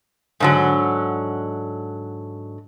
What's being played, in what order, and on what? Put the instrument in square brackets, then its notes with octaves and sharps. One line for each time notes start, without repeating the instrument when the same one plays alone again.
[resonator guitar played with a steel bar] G#2 D3 F#3